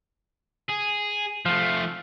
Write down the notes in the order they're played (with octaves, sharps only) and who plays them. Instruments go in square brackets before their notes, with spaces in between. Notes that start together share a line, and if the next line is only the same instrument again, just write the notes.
[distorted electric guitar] G#4
[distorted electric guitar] F3 A3 [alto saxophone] F5